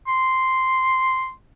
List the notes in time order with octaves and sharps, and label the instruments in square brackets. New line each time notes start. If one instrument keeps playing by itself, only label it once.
[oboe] C6